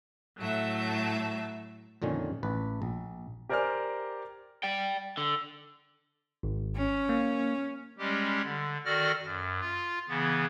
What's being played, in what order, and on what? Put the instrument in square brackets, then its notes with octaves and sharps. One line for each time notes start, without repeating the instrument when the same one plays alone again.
[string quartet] A2 F#3 A3 E5
[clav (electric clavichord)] F2 A#2 D3 D#3 C#4
A1 B4
A#1
[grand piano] G4 A#4 C5 D5 G#5 F6
[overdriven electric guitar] D5 G5
D3
[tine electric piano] G#1
[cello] C#4
[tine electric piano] A#3
[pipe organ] G3 G#3 C#4 G4
D3
D#3 F#4 A4 D5 F6 A#6
F#2
F4
C#3 E3 B3